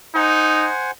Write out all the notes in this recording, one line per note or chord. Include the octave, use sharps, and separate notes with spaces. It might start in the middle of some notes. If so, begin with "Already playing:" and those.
D#4 C5 F#5 G#5